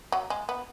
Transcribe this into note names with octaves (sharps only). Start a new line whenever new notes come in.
F#3
G#3
B3